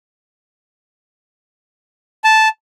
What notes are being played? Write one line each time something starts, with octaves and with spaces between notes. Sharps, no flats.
A5